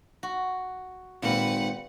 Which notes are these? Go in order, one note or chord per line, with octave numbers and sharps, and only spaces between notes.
F#4
G#1 A#2 C4 B4 F#5